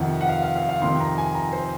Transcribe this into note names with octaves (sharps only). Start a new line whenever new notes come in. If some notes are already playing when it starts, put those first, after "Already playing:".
Already playing: F2 C3 D#3 F#5
F#5
F5
F5
F5
F5
F2 C3 D#3 C6
A#5
G#5
A#5
C5